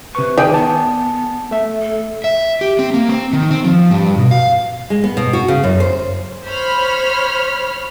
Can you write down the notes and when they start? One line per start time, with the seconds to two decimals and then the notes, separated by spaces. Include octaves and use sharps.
0.15 C3 B4 C#6
0.38 D#3 G#4 D5 G5
0.54 B3 A5
1.51 A3 E5
1.82 A4
2.24 E5
2.61 G4
2.79 C4
2.94 A#3
3.09 C4
3.33 D#3
3.51 C4
3.64 F3
3.91 G2
4.18 B2
4.31 F5
4.90 G#3
5.04 B3
5.17 B2
5.33 F#4
5.48 C#3
5.64 F#2
5.80 C5
6.46 C5 C#5 B5 F6